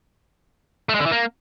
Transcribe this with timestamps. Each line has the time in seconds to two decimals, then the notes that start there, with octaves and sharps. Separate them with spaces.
0.89 A3
0.95 G#3
1.00 D3
1.06 E3
1.12 A#3